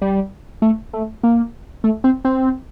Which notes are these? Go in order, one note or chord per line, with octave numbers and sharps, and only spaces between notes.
G3
A3
A3
A#3
A3
C4
C4